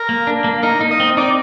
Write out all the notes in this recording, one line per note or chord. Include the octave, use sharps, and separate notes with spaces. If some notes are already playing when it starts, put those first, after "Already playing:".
Already playing: A#4
A#3
D4
A#3
D#4 A#4
D#4
D#5
C4
D#4 D5